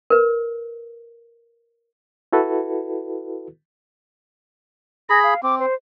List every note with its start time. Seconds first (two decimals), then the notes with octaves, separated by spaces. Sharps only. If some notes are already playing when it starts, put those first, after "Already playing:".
0.10 A#4 B4
2.33 E4 F#4 A4 B4
5.10 G#4 B5 A#6
5.23 F5
5.43 C4 D6
5.60 C5